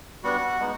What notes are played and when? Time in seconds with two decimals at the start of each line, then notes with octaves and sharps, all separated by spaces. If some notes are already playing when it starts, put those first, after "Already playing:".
0.23 G3 B3 D4 F#4 F#5
0.59 G#3 B3 D#4